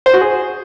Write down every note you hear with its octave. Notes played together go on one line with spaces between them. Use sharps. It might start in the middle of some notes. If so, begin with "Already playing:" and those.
C5
F#4
G#4